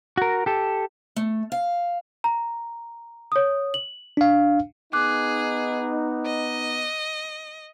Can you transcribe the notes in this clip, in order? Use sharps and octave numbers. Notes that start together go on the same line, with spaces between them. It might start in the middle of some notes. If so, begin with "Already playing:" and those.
F#4 A#4
G4 A4
A3
F5
A#5
C#5 D#6
F#7
D4 F5
B3 D#4 G#4 D6 F#6
D#5